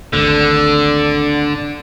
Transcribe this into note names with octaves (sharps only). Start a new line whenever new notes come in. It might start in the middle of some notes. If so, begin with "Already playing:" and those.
G#1 D2 D3